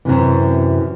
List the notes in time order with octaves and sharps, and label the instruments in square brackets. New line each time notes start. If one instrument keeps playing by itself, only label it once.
[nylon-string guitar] F#2 A2 C3 E3